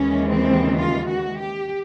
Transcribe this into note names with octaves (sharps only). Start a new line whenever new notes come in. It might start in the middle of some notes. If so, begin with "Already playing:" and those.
Already playing: D#2 C#3 E3 G#3 C#4
C4
F4
F#4
G4